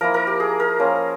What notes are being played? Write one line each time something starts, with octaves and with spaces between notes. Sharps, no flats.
F3 A#3 E4 A#4
A#4
G4
G#4
A#4
F3 A#3 C#4 F4